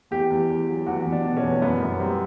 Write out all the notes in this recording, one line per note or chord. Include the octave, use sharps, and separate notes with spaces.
E2 G4
E2
E2
F#3
E2 F#4
E2
D4
B2
C#4
E2
F#2 B3
F#2
G3 C4